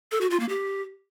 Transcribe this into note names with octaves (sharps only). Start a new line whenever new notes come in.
A4
F#4
F4
A#3
G4